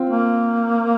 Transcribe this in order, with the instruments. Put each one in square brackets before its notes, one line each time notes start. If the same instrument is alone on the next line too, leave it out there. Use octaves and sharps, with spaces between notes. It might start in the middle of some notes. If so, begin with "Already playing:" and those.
Already playing: [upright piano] C4 F4
[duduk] A#3